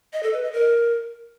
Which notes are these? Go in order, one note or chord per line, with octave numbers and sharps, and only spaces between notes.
D#5
A4
B4
D#5
A#4